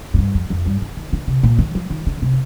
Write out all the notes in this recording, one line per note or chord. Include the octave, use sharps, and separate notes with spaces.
A2
G2
F2
F2
G2
D#3
D#3
D3
C3
A#2
D#3
F3
D#3
D3
C3